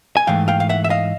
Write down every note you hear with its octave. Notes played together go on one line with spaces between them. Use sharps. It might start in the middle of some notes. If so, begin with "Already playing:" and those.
G#5
G#2 E3 A3 F5 G5
F5 G5
F5
E5 F#5
E5
D#5 F5